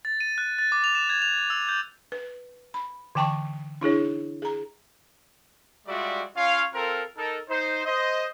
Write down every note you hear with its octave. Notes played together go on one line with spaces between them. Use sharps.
A6
D#7
F#6
A6
D6
F7
E7
G#6
F7
E6
G6
B4
B5
D3 E3 G5 A5 C#6
D4 E4 G#4 C#5
G#4 A#5
G3 G#3 F4 F#4 D5 E5
C#4 F4 C#5 F5
C4 F4 A4 A#4
D#4 A4 A#4
D#4 C5
C5 D#5